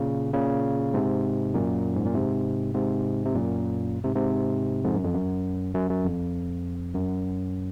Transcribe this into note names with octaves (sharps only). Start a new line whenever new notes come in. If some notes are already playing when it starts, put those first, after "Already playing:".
Already playing: A#2 C#3
A#2 C#3
G#2 C3
F#2 A#2
G#2
A#2
G#2 C3
G#2 C3
C3
F#2 A#2
G#2 C3
G#2 C3
F2 G#2
F#2
F2
F#2
F#2
F#2
F2
F#2